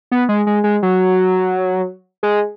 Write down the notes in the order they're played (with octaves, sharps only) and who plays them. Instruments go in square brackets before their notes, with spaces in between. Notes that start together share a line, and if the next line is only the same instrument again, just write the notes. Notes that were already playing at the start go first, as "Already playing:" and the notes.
[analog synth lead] B3
G#3
G#3
G#3
F#3
G#3